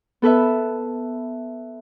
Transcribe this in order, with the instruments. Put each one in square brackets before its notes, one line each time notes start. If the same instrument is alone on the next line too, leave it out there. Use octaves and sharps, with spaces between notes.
[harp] B3 A4 B4 E5